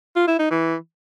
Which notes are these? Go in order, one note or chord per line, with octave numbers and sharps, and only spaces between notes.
F4
E4
D#4
E3